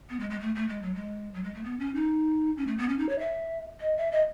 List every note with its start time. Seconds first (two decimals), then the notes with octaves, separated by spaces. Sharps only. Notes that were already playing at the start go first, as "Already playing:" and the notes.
0.09 B3
0.19 G#3
0.30 G#3
0.40 A3
0.55 A3
0.68 G#3
0.82 F#3
0.94 G#3
1.34 F#3
1.43 G#3
1.54 A3
1.64 B3
1.79 C#4
1.95 D#4
2.57 C#4
2.67 A3
2.78 B3
2.89 C#4
2.98 D#4
3.09 C#5
3.19 E5
3.81 D#5
3.97 E5
4.11 D#5